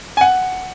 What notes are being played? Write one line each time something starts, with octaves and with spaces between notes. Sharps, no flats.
G#5
F#5